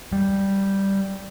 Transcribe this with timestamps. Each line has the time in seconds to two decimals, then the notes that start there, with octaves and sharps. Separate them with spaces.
0.12 G3